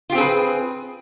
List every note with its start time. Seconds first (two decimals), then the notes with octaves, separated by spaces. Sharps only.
0.10 F4
0.12 G4
0.15 C4
0.18 G#4
0.20 B4